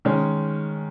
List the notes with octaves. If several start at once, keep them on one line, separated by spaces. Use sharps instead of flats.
D#3 G#3 C#4